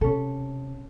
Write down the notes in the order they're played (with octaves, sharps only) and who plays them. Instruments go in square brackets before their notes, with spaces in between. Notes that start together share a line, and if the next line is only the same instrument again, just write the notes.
[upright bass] C3 [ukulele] C#4 A4